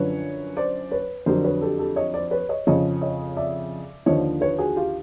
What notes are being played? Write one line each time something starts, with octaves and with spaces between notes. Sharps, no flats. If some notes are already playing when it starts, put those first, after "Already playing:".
Already playing: F#2 D3 F3 B4 C#5
C5 D5
B4 C#5
F2 D3 F#3 A#4 C5
B4 C#5
G4 A4
G4 A4
C#5 D#5
C5 D5
B4 C#5
C#5 D#5
F2 C#3 F3 C#5 D#5
C#5 D#5
D5 E5
D#2 D3 F3 C#5 D#5
B4 C#5
F#4 G#4
F4 G4